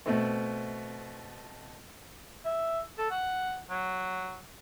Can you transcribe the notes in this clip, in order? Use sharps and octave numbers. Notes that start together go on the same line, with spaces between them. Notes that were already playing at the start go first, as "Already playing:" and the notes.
B2 A3 C4
E5
A4
F#5
F#3